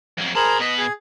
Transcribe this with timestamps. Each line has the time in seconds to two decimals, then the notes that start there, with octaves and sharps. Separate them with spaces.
0.18 F2 F#3
0.36 G#4 A#4 C5 A5 B5
0.60 B2 B4 D#5
0.78 G#4